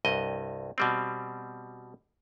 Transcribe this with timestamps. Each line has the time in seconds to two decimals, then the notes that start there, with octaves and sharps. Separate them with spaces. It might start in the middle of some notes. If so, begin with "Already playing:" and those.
0.05 C2 G2 D#5
0.78 B2 G3 C4